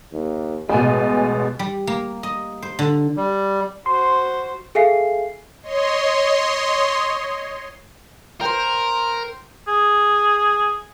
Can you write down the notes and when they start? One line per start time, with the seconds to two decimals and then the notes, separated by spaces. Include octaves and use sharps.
0.13 D#2
0.70 A1 B2 G#3 G#5
1.59 G3
1.87 A#3
2.23 D#5
2.62 C5
2.79 D3
3.17 G3
3.86 F#4 C5 C6
4.75 G#4 A4 E5 F5 G#5 C7
5.63 C#5 D#5 C6
8.41 A#4 C5 G5
9.68 G#4